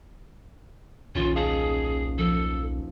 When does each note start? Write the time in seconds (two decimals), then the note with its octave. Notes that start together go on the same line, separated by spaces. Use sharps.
1.15 D#1 B1 C#4 F4
1.35 G#4 D#5 F5 A5
2.18 F3 A4